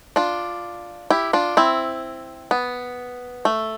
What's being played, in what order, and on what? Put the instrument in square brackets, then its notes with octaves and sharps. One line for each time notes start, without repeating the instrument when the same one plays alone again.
[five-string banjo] D4 F4
E4 G4
D4 F4
C4 E4
B3
A3